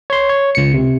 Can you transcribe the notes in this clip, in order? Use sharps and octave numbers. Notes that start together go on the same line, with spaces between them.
C#5 C6
C#5
C#2 C#7
C3